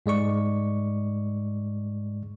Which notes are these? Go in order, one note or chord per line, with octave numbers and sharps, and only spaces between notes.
G#2 G#3 D5 C#6